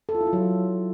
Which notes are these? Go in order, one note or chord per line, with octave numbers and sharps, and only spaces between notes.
A4
F4
E4
F4
F#3